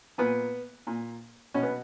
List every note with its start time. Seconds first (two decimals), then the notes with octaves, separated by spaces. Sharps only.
0.18 A#2 B3
0.87 A#2
1.54 B2 C#4
1.63 B3